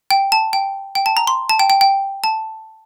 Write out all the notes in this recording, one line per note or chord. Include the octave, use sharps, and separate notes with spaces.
G5
A5
G5
G5
A5
A#5
C6
A5
G5
G5
G5
A5